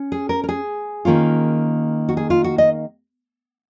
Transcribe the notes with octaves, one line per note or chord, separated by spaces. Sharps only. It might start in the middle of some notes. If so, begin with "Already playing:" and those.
Already playing: C#4
G#4
A#4
A#4
G#4
D#3 A#3 C#4 F4
F#4
G#4
F4
F#4
D#5